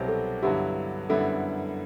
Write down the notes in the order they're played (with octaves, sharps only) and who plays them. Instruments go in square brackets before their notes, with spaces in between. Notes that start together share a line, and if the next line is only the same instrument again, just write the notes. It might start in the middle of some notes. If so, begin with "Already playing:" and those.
Already playing: [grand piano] C2 B2 F#3 C4 G4
[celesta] A4
[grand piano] G2 D3 F#3 B3 E4 [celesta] G4
[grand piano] F#2 D3 G3 B3 E4 [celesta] A4